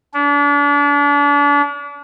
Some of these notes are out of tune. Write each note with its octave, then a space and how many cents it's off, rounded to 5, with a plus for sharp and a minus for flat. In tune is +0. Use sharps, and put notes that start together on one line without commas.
D4 -35